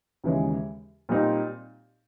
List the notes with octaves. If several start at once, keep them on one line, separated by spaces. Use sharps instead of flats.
D#2 C#3 E3 G#3
A#2 G3 C4 D#4 G4